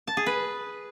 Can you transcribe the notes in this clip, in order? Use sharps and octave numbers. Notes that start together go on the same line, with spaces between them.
A5
G#4
B4